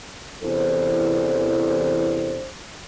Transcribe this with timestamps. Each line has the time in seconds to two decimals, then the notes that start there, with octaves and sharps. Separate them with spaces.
0.43 E2 C3 E3 D4 A4 C5